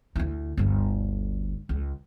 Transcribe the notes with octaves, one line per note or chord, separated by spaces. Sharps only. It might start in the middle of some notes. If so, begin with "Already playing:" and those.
D2 E4
G1 D2
C#2